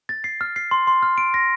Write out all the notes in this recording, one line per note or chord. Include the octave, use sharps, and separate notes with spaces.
A6
C7
F6
C7
C6
C6
F6
D7
A#6